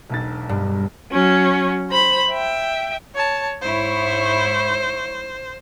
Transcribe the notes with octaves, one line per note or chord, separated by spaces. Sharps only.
E1 B1 A6
G2
F#3 C#4
C5 B5
E5 G5
C#5 A5
G#2 E4 C5 C#5